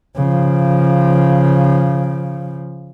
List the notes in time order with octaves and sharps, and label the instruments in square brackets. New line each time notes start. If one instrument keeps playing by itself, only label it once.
[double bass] C#3 F3